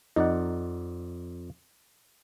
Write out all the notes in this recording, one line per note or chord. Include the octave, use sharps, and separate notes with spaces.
F2 D#4 D5 F#5